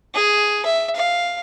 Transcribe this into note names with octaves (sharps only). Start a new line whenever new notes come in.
G#4
E5
F5